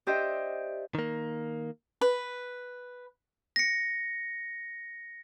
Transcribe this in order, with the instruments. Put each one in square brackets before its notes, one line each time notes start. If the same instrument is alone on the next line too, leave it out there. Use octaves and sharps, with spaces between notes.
[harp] D4 G4 C5 D#5 E5 G5
[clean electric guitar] D#3 A#3
[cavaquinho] B4
[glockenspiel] A#6 C#7